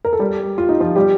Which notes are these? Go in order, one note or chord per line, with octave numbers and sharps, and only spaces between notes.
A#4
A4
G3 G4
F4
D#4
F3 F4
G3 G4